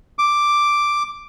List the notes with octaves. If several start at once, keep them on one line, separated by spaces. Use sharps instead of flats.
D6